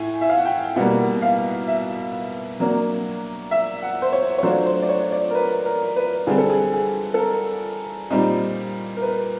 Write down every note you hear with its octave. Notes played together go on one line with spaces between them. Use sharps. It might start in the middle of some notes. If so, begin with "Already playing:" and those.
Already playing: A2 G#5
E5
F5
F#5
G5
B2 G3 A#3 F#5
F5
E5
F#3 A#3 D4
E5
F#5
C5
C#5
C#5
F#3 A3 D4 F4 C5
C5
D5
C#5
D5
A#4
B4
A#4
B4
D3 G3 C4 G#4
A4
G#4
G#4
A4
A#4
A#2 G3 C4 D#4
A#4
B4